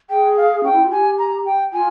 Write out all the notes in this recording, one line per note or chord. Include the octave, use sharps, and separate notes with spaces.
G#4 G5
F5
C#4 G5
E4
F4
G4 G#5
A#5
G5
F4 G#5